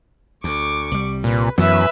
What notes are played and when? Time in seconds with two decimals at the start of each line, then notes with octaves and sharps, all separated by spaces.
0.44 D2 C#6 D6
0.91 C2 G3
1.24 A#2 B4
1.58 F#2 E3 F#3 B3 B4 E5